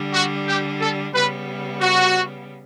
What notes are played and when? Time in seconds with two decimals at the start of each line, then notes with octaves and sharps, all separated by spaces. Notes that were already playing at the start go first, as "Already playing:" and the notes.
Already playing: D3 G3 D4
0.13 F#4
0.47 G4
0.80 A4
1.14 C#3 G3 B3 B4
1.81 F#4